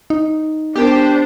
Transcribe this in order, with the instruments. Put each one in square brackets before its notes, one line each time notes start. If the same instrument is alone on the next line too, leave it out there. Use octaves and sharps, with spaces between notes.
[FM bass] D#4
[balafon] B3 A#4 [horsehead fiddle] D4 C5 [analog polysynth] G4